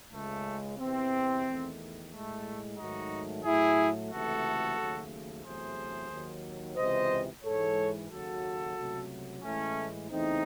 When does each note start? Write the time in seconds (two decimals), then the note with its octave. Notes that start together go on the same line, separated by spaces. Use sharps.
0.12 C#2 C#3 G#3 A3
0.78 E2 C3 E3 C4
1.45 E2 D#3 A3
2.12 A2 G#3 A3
2.78 G#2 D#3 F#3 A3 D#4 F#4
3.44 A2 F#3 A3 E4 G#4
4.11 C#2 C3 E3 A3 F#4 A4
4.78 D#2 C#3 F#3 A3
5.44 E2 C3 F#3 A3 G#4 C5
6.10 D#2 D#3 F#3
6.77 C#2 C3 E3 C5 D#5
7.44 G#2 E3 G#3 A4 C#5
8.10 D#2 C#3 F#3 F#4 A4
8.76 C#2 C3 F#3 A3
9.43 A2 E3 G#3 A3 C#4
10.10 E2 C#3 E3 A3 C4 D#4